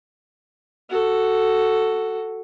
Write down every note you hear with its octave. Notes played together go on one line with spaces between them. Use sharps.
F#4 A4